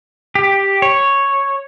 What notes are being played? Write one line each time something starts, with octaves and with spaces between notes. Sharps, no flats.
G4
C#5